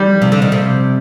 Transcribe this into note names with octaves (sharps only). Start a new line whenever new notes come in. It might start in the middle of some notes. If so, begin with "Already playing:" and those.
Already playing: G3
C3
D3
D#3
C3